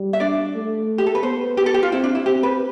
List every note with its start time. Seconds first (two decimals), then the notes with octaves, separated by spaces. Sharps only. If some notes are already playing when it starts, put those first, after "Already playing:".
Already playing: G3
0.13 E5
0.20 D4 D5
0.55 A3
0.98 G4
1.06 A4
1.15 B4
1.23 B3 C5
1.57 G4
1.66 A4
1.74 G4
1.83 F4
1.92 C4 E4
2.04 D4
2.15 E4
2.26 C4 G4
2.43 B4